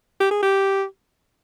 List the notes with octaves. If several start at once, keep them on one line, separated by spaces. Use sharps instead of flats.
G4
G#4
G4